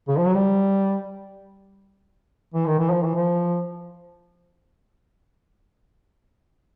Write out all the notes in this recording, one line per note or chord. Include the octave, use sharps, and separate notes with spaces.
C#3
F3
F#3
G3
E3
D#3
E3
F3
E3
F3